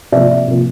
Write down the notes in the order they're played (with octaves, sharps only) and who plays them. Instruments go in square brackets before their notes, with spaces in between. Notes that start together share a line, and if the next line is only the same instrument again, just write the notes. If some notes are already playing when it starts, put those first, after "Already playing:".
[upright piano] C3 F3 A#3 D5 E5
C3 F3 A#3